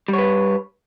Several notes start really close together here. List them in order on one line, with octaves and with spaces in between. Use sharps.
G3 C#5 B4